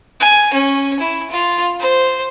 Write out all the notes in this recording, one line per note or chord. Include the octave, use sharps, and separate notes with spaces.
G#5
C#4
E4
F4
C5